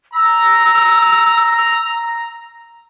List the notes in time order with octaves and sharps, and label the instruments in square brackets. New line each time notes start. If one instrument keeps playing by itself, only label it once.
[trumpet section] A#5 [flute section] E6